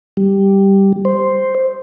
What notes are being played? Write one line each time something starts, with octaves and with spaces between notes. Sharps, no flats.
G3
C5